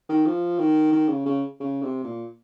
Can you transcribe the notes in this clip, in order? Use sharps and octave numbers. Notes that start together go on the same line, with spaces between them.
D#3
F3
D#3
D#3
C#3
C#3
C#3
C3
A#2